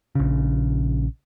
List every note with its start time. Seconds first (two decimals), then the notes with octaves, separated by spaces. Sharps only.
0.15 A#1 C#3